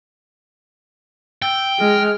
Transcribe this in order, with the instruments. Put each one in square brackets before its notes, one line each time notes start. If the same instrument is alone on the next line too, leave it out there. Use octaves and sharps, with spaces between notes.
[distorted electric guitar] G5 [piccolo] E6
[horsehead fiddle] G#3 [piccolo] F6